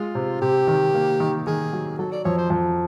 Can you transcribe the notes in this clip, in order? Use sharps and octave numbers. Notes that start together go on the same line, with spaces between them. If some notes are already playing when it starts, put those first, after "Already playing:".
Already playing: G#3 F4
C3
C3 G4
D#3
A#3
D#3
D#3 G#4
F#3
F#3 A4
D5
F2 C#5
C5
F2